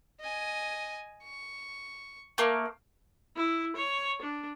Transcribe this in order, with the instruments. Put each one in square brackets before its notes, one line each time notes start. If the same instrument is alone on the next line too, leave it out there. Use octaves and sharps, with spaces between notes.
[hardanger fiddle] D#5 G#5
C#6
[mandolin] A3 A#3
[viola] E4
C#5
D4